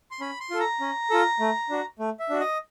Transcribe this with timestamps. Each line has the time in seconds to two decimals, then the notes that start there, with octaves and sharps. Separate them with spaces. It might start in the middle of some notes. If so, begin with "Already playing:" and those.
0.11 C6
0.20 C#4 B5
0.40 C6
0.50 F4 A4
0.60 A#5
0.80 C#4
1.10 F4 A4
1.40 A3
1.70 D4 F#4
1.99 A3
2.20 E5
2.29 D4 F#4
2.40 D#5